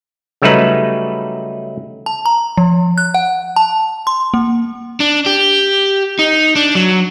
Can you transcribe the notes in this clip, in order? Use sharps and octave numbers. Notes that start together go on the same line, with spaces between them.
C#3 F#3 G3 A3 D#4 B4
A5
A#5
F3
F#6
F#5
A5
C6
A#3
D4
G4
D#4
D4
F#3